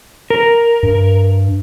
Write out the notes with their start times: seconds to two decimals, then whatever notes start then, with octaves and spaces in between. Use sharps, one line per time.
0.30 A#4
0.83 G2